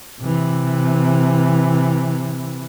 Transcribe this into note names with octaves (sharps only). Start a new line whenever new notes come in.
C3 E3